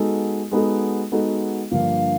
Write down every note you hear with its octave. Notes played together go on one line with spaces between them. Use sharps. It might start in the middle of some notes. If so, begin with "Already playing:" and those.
Already playing: G#3 B3 D#4 F#4 A4
G#3 B3 D#4 F#4 A4
G#3 B3 D#4 F#4 A4
G2 D3 F3 A#3 D4 F5